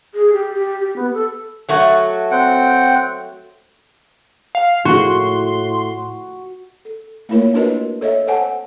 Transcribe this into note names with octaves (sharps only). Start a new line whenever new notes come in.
G#4
G4
G4
G4
B3
A4
F#3 A3 F#4
C4 F#5 G5
F5
A2 F#4 C6
A4
A3 A#3 E4 F4 A#4 C#5
D4 E4 F#4 A#4 B4 D#5
A4 C#5 D#5 E5
A4 C5 F#5 G#5 A5